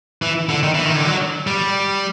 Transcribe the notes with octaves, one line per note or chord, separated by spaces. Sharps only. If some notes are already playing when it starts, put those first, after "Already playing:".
E3
D3
D#3
E3
D#3
D3
F#3
G3